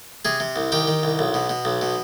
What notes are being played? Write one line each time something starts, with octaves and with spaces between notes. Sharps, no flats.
C3 G#4
C3
C2
D#3 G4
D#3
C2
B1
B2
B2
B1
B2